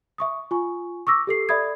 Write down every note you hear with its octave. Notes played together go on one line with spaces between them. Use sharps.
E5 C#6 D#6
F4 G#5 C#6
C#6 D6 E6 A#6
G4 A4 C7
A4 D5 E5 B5 D#6 G#6